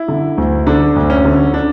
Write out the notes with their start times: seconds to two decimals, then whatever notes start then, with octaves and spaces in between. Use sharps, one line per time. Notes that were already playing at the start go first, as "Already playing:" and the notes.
Already playing: E4
0.08 D3
0.38 D2
0.67 D3 D4
0.96 D2
1.10 C#4
1.25 D3
1.54 D4